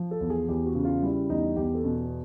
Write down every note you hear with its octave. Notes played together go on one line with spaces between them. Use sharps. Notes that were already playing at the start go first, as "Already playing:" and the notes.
Already playing: F3
A4
E2
G#4
E2 G4
F#4
C#3
F4
G3 E4
E2 D#4
E2 G4
A4
B2